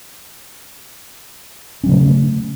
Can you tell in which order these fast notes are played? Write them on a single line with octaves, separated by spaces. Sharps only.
C#4 F#3 C#3 A3